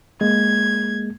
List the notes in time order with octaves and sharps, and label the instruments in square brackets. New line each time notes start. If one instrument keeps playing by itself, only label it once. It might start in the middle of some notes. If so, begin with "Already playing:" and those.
[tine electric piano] G#3 A#3 [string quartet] G#6